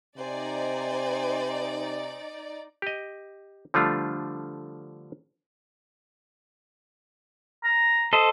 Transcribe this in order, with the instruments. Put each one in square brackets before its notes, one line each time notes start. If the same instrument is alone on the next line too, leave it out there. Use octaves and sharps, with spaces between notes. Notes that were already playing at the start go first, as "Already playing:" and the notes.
[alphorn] C3 [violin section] D#4 D5 [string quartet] C5 G#5
[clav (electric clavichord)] G4 D#5
D3 F3 G3 A3 D4 F4
[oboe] A#5
[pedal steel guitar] A4 C5 D#5